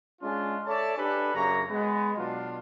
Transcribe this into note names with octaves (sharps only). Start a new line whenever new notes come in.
G#3 C#4 D4 F4
A4 C#5 D5 E5 A5
D4 G4 A4 B4 G#5 B5
F#2 C#3 A#3 C#5 A#5
G#3 B3
B2 F#3 D4 F4